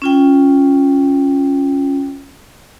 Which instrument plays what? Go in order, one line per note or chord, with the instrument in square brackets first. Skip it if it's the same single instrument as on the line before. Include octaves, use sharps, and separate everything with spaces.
[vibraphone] C#4 F4 G5